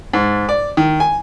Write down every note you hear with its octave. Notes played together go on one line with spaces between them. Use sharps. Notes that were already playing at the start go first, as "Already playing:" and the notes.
G#2
D5
D#3
G#5